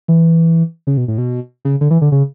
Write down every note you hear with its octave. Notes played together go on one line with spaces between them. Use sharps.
E3
C#3
B2
A2
B2
C#3
D3
E3
D3
C#3